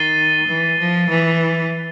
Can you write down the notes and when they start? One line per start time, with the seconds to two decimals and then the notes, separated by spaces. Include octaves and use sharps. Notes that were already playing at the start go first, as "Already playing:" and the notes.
Already playing: D#3 A6 C7 D#7 G7
0.47 E3
0.79 F3
1.09 E3